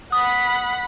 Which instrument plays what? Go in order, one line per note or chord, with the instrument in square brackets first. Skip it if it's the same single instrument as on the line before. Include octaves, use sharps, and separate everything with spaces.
[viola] F#5 B5 [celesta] D#6